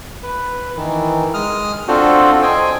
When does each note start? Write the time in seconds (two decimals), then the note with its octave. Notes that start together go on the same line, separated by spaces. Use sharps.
0.23 B4
0.77 D#3 E3
1.34 G#3 D#6 F6
1.88 C4 D4 F4 F#4 A4 C5
2.42 C5 D#5 G5 G#5